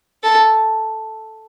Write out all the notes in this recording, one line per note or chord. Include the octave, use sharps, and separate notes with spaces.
A4